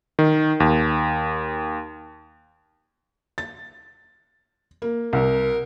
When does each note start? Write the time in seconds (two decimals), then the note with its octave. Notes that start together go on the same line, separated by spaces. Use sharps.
0.19 D#3
0.60 D#2
3.38 A6
4.82 A#3
5.13 C2 A#4